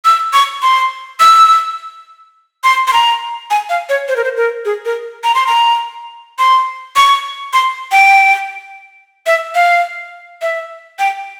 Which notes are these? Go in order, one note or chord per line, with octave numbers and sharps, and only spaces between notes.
E6
C#6
C6
E6
C6
C6
A#5
G#5
F5
C#5
C5
A#4
C5
A#4
G#4
A#4
A#5
C6
A#5
C6
C#6
C6
G5
E5
F5
E5
G5